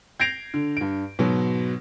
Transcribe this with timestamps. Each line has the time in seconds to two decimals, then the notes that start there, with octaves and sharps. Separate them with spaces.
0.20 G6 G#6 A#6 C7 D7 F7
0.54 D3
0.77 G2 D7
1.19 G#2 B2 F#3